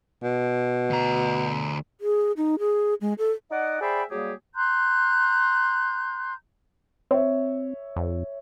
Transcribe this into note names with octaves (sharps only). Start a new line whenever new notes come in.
B2
D2 A#5
G#4
D#4
G#4
G#3
A4
D#4 D5 D#5 F#5
G#4 C5 D5 E5 G5 B5
F#3 G3 A#3 G4 G#4
A#5 C6 F#6 G6
C4 C#5 E5
F2